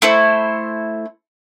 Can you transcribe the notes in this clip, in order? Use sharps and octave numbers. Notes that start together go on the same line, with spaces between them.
A3 E4 C5